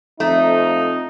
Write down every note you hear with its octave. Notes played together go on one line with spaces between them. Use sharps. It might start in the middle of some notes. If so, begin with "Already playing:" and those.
F2 A3 D#4